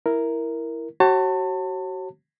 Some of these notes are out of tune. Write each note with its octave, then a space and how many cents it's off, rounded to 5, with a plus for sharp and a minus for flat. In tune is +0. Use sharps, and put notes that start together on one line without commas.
E4 +0 A#4 +0
F#4 +30 C#5 -35 A5 +30